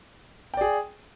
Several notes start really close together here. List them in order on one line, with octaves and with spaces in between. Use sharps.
G5 D5 G#4